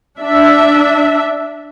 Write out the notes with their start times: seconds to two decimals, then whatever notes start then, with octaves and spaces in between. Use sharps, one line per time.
0.20 D4 E5